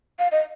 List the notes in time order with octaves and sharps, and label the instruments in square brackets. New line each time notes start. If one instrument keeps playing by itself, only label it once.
[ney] F5
D#5